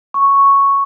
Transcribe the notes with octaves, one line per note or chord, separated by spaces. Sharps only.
C#6